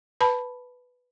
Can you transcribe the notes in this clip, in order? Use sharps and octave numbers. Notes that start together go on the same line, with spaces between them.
B4 A5 B5